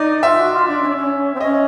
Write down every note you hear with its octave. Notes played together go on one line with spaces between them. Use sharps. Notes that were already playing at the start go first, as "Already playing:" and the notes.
Already playing: D#4 D5 D#5
F4 E5
F#4
F4
D4
C#4
D4
C#4
C4
C#4 D#5